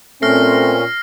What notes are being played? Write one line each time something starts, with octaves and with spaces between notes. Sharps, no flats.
A#2 A3 C4 C#4 F6 A#6 C7